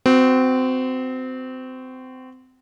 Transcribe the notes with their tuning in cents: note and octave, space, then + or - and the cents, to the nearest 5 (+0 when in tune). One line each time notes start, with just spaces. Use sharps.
C4 -25 F#4 -5